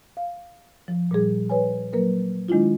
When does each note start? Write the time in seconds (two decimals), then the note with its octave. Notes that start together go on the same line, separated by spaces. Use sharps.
0.17 F5
0.88 F3
1.11 A#2 G3 G#4
1.50 B4 C#5 G#5
1.93 F#3 A#3 A#4 B4
2.48 D#3 G#3 D4 E4 F4